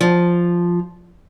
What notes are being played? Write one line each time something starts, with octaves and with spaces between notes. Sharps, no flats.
F3